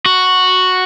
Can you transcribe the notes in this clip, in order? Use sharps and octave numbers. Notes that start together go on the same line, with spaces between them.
F#4